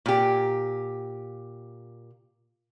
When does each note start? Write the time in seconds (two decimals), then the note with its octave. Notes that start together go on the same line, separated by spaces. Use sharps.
0.06 A#2 G4